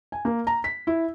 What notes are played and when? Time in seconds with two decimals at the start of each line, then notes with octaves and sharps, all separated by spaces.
0.12 G#5
0.25 A#3
0.47 A#5
0.64 B6
0.87 E4